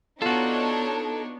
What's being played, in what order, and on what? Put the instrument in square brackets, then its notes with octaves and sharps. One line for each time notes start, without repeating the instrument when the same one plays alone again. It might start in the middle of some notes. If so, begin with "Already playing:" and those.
[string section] B3 [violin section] D4 D#4 C#5 [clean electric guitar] F4 F#4 [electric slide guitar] A4